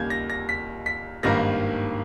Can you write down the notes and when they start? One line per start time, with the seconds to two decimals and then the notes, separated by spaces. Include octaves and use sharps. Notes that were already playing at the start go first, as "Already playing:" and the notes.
Already playing: D#2 C#3 G3 A#3 G6 G#6
0.10 A#6
0.30 A#6
0.49 B6
0.86 B6
1.23 G#1 G2 D#3 A#3 A#6